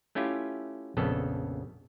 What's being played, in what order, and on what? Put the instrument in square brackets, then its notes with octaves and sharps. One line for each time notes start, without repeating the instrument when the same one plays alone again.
[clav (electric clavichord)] A3 C#4 E4 F4 G4
A#1 F2 C#3 B3 A4